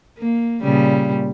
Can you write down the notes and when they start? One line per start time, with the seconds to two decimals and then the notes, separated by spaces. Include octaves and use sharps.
0.18 A#3
0.63 A#2 C#3 G3